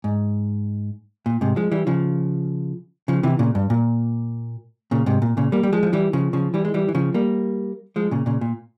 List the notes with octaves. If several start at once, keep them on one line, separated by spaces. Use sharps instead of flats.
G#2
A#2
G#2 C3
F3 G#3
E3 G3
C#3 F3
C#3 F3
C3 E3
A#2 C#3
G2
A#2
A#2 C#3
G#2 C3
A#2
A#2 C#3
G3 A#3
G3
F3 G#3
F3
E3 G3
C#3 F3
C#3 F3
E3 G3
G#3
E3 G3
E3
C#3 F3
G3 A#3
F3 G#3
A#2 C#3
A#2 C#3
A#2